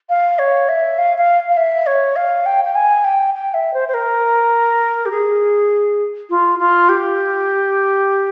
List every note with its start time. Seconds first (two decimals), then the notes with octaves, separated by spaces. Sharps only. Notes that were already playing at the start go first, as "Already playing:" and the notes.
0.09 F5
0.39 C#5
0.69 E5
0.98 F5
1.18 F5
1.49 F5
1.57 E5
1.87 C#5
2.16 F5
2.46 G5
2.64 G5
2.75 G#5
3.04 G5
3.34 G5
3.54 E5
3.74 C5
3.88 C5
3.94 A#4
5.06 G4
5.11 G#4
6.30 F4
6.59 F4
6.89 G4